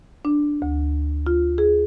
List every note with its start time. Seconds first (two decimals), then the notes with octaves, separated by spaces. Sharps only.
0.25 D4
0.62 D2
1.27 F4
1.58 G#4